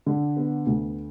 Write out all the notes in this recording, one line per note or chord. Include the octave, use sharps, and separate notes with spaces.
D3
B3
D2